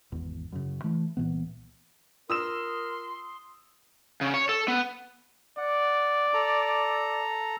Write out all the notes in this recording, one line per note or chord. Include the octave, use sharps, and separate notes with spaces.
G#1 E2
F#2 C#3
E3 A3
C2 A#2 E3 B3
F4 A#4 C6 D#6 E6 E7
C#3
C#5
A4
B3
D5 F#5
A4 A#5